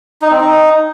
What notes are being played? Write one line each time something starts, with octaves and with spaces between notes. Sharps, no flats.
D#4
C4
D#4